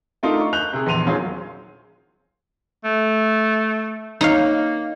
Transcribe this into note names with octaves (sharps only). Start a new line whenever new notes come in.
A3 D4 D#4 F4 A4 A#4
C#6
F#6 G6 F7
C3 G#4
A#1 E2 C6 D#7 F7
D#3 F#3 F4 G#4 C5
A3
A#3 D#4 C#5 F5